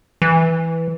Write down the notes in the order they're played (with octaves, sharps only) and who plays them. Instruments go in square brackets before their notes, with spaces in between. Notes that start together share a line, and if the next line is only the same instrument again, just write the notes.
[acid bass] E3